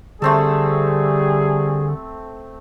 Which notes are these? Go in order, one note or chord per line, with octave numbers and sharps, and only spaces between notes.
D3 G3 A3 C4 G#4 A4